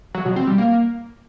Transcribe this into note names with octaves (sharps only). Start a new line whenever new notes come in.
F#3
B2
C4
G3
A#3